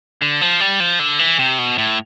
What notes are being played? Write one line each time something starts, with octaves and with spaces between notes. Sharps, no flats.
D3
F3
G3
F3
D3
E3
C3
B2
A2